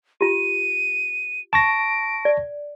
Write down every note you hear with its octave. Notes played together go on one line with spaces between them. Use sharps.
F4 G4 D#7
A5 C#6 A#6 D7
D5